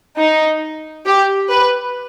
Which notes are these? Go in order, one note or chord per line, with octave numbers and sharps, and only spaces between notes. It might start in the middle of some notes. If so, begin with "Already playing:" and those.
D#4
G4
B4